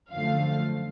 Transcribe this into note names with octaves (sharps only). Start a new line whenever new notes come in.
F#2 D3 F3 A3 F5